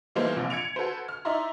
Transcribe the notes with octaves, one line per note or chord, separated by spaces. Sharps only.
E3 G3 A3 A#3 D#4 C5
A#1 C3 F3
G#6 C#7 D7 F7
F#4 A4 B4 C5
F6
D#4 E4 D5 E5 A#5 C6